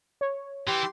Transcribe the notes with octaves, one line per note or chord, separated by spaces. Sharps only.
C#5
E3 G4 C6